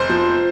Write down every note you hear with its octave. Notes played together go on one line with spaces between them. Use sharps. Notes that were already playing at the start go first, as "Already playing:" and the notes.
Already playing: F1 C5
F3